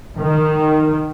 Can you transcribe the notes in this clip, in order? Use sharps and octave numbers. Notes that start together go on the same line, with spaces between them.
D#3